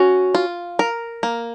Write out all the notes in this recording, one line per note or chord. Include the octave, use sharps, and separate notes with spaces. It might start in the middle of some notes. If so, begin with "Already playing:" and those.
Already playing: C#4 F#4
F4
A#4
A#3